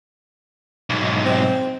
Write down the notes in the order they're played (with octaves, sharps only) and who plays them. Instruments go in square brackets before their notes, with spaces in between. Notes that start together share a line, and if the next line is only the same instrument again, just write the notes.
[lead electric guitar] B1 G#2
[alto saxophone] C4